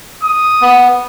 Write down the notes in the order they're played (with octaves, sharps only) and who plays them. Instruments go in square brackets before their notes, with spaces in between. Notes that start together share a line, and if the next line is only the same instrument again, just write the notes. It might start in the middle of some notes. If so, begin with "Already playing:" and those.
[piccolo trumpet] D#6
[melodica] B3